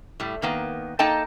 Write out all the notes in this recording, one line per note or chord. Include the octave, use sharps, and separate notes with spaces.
A2 G3
D#3 A#3 B3
A#3 D#4 A4 D#5 G5 A5